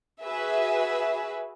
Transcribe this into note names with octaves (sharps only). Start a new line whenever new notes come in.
F#4 G#4 B4 E5